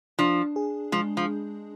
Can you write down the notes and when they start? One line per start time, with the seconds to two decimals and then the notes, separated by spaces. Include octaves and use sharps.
0.19 F3 D4
0.56 G#4
0.92 F3 G#3
1.17 F3